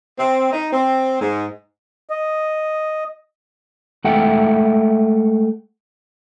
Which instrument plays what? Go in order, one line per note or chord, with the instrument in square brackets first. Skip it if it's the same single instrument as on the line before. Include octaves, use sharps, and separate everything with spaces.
[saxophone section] C4
D#4
C4
G#2
[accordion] D#5
[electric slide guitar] G#3 A3 E5 F#5 G5